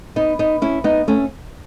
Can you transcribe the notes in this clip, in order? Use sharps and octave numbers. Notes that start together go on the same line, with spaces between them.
B3 D#4
B3 D#4
C#4 E4
B3 D#4
A3 C#4